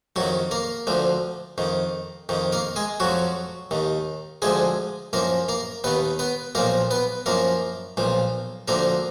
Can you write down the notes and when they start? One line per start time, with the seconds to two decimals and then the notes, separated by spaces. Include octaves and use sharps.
0.16 F2 D#3 F#3 F#4
0.51 A#3 A#4
0.87 D2 D3 F3
1.58 F2 D#3
2.29 F2 D#3
2.52 A#3 A#4
2.76 G#3 G#4
3.00 F2 F3 F#3 F#4
3.71 D#2 D#3
4.42 D2 D3 F3 G#3 G#4
5.13 F#2 F3 A#3 A#4
5.49 A#3 A#4
5.84 D#2 D#3 B3 B4
6.19 B3 B4
6.55 B1 A#2 F3 A#3 A#4
6.91 B3 B4
7.26 F#2 F3 A#3 A#4
7.97 B1 A#2 F3
8.68 D2 D3 F3 A#3 A#4